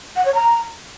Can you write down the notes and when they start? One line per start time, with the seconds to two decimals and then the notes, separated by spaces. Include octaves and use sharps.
0.16 F#5
0.25 C#5
0.34 A#5